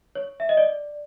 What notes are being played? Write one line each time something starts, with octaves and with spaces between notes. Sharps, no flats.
C#5
E5
D#5
D5